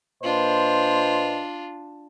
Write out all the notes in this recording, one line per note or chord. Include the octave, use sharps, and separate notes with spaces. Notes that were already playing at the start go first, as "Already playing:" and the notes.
A#2 D4 F4 B4 C5 D#5